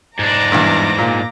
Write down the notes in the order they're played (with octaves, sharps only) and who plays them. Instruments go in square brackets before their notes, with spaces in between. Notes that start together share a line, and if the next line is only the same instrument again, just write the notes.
[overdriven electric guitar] G#2 D4 [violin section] A#5 D6 A#6
[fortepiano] E2 G2
A#2